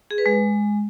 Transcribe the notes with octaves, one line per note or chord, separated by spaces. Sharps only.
G#4
B4
G#3